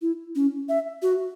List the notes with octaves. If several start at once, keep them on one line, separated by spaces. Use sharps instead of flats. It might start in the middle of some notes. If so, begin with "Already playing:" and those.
E4
C#4
E5
F#4